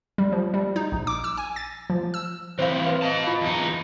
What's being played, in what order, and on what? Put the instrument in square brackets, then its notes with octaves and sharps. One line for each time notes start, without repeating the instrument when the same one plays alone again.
[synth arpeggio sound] G3
F3
G3
D#4
A#1
D6
E6
G#5
A6
F3
E6
[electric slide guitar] E3 C4 [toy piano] C5 F5
[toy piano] B4 F5
[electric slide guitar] D#5 A5
[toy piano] F4 F5
[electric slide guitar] E2 D#4